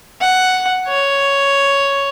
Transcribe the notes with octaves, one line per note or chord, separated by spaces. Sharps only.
F#5
C#5